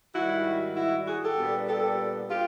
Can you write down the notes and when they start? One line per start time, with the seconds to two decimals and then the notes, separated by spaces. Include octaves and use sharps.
0.14 G#2 D#3 G3 E4 F#4
0.76 E4 F#4
1.07 F#4 G#4
1.22 G4 A4
1.38 A#2 G3 B3 D4
1.68 G4 A4
2.30 F4 G4